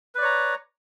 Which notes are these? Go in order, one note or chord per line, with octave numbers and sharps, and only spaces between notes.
B4 C#5 D5 A#5